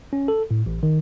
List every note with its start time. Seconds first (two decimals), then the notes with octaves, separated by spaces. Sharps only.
0.13 C#4
0.28 A4
0.51 A2
0.66 A1
0.83 D#3